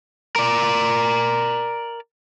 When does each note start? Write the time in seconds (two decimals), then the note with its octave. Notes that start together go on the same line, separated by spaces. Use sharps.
0.36 A#4 D5